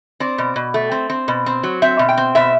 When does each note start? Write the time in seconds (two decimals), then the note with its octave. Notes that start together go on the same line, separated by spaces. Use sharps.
0.20 C4 D5
0.38 B2
0.56 B2
0.74 A3
0.92 C4
1.10 C4
1.28 B2
1.46 C4
1.63 F#3
1.82 C4 E5
1.99 B2
2.09 G5
2.17 C4
2.35 B2 E5